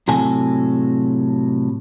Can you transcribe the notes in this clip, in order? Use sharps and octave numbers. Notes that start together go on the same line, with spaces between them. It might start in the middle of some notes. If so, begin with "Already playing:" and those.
A2 C3 F#3 A4 G#5